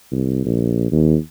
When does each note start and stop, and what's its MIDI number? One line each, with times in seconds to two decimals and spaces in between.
0.12 0.41 36
0.45 0.91 34
0.92 1.16 39